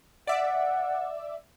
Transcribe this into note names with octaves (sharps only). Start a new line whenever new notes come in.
D5 E5 F#5